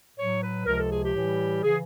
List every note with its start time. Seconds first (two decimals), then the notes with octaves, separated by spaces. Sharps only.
0.18 A2 F#3 C#5
0.42 B4
0.66 C#2 C3 F3 A#4
0.79 A4
0.91 G#4
1.03 G4
1.15 A2 E3 G3
1.63 C#3 E3 G#4